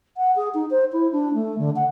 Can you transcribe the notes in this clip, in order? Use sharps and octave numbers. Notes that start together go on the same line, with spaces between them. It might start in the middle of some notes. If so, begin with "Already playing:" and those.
F#5
G#4
D#4
C5
E4
D4
A3
D3
F#5